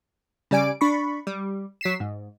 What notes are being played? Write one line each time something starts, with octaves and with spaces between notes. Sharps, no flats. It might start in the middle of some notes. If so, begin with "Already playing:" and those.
C#3 G3 D5 G#5 D7
D4 B5 C#6
G3
F#3 B6 C7 E7
G#2